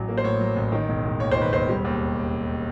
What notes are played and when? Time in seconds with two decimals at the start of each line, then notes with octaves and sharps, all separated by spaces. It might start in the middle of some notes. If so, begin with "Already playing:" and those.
Already playing: A1 F#3
0.09 A#3
0.17 C5
0.24 A2 C#5
0.40 F#3
0.56 A1
0.72 D#3
0.89 E1
1.05 E1
1.20 D#2 C#5
1.31 D#3 C5
1.41 B4
1.52 E1 C5
1.68 G3
1.85 D#2